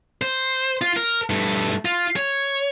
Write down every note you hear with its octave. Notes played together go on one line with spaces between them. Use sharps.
C5
F4
A#4
G2 A3
F4
C#5